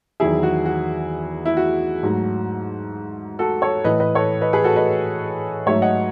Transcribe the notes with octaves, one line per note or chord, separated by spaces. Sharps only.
E2 D#3 F#3 E4 G#4
F#4
F#4
E4
F#4
G#2 F#3 A3
F#4 A4
A4 C#5
A2 E3 A3 B4 D#5
B4 D#5
A4 C#5
B4 D#5
G#4 B4
F#4 A4
B4 D#5
G#2 F#3 A3 C#5 E5
D#5 F#5